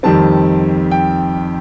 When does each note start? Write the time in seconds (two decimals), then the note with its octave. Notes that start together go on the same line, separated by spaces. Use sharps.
0.03 F2 D#3 G3 C4 A5
0.91 G5